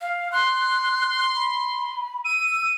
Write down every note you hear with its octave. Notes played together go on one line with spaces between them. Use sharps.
F5
C6 F#6
B5
E6 D#7